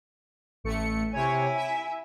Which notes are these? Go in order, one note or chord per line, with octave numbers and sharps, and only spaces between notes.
A1 A3 C#7
C3 E4 C#5 G#5
E5